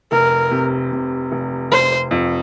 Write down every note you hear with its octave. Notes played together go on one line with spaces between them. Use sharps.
F1 A#4
C3
C3
F1
F1 C5
F2